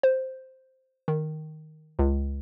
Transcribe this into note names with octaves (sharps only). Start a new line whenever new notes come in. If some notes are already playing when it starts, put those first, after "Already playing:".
C5
D#3
C#2